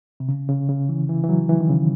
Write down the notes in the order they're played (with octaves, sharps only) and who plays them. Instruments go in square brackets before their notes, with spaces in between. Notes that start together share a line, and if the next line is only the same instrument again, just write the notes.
[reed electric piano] C3
C#3
C#3
C#3
E3
E3
E3
F#3
E3
D#3
C#3